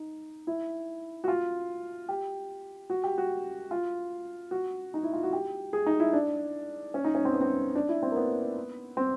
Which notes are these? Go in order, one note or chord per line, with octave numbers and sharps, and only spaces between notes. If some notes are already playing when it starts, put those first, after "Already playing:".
Already playing: D#4
E4
F#4
F4
G4
F#4
G4
F#4
F4
F#4
D#4
E4
F4
F#4
G4
G#4
D#4
E4
D4
C#4
D#4
C#4
C4
B3
C4
D4
E4
C4
A#3
B3
C4